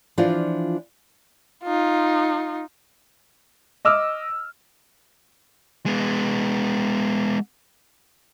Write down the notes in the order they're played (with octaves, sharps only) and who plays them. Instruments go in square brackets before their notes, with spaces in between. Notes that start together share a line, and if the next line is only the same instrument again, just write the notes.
[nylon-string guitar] E3 F3 D4 F4 D5
[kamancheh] D#4 F4
[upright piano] D#5 D6 E6 F6
[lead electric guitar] G#3 B3